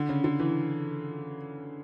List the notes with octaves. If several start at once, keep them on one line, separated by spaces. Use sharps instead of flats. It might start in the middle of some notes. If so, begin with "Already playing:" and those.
Already playing: D3
C#3
D3
E3